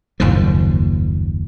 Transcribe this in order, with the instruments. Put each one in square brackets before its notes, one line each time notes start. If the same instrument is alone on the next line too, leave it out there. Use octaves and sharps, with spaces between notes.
[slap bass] F#1 D#2 G#2 F3